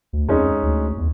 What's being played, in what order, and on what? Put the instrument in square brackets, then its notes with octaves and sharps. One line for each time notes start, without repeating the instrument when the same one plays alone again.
[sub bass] D2
[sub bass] F2 [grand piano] G#3 C#4 D#4
[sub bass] D2
E2